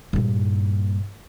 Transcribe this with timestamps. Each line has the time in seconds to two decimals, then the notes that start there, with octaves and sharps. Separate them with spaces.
0.13 G2 A#2